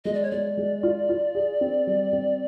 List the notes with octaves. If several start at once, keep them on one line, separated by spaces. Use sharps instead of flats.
G#3 D#5
D5
C#5
G#3 D5
G#3
F4
F4
G#4
C4
G3
C4